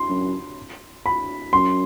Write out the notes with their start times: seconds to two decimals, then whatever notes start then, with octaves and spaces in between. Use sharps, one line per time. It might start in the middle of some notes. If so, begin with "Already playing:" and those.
Already playing: C6
0.09 F#2
1.06 B5
1.53 F#2 C6